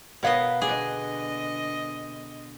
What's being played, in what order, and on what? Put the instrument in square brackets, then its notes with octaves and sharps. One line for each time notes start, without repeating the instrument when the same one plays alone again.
[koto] B2 B3 D#5 [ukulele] A#4 C#5 F5
[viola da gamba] D3 D#5 [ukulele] D4 [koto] G#4